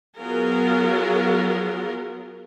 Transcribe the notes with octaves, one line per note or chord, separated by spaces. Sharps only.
F#3 B3 F4 G#4 A#4